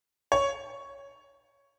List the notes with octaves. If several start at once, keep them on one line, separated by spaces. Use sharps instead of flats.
C#5